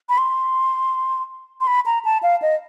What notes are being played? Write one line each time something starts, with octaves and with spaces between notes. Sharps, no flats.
B5
C6
C6
B5
A#5
A5
F5
D#5